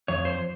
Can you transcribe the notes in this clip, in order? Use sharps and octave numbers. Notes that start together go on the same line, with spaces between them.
F2 C#5
C5